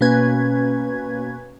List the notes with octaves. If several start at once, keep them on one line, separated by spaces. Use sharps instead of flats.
B2 A#3 C#4 B4 G#6